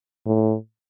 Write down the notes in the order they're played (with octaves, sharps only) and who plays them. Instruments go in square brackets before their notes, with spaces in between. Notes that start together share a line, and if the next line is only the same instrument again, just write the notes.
[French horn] A2